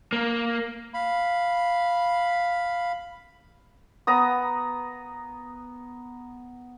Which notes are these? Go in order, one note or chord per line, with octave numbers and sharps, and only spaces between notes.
A#3
F5 B5
B3 A#5 D#6